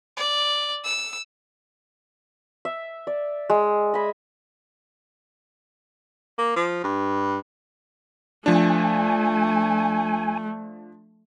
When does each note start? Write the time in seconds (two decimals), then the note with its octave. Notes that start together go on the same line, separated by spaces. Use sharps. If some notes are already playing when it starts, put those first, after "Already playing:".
0.17 D5
0.84 E6
2.65 E5
3.07 D5
3.50 G#3
3.94 D#5 E5 G#5 B5
6.38 A#3
6.56 F3
6.84 G2
8.46 F3 A3 D4 G#5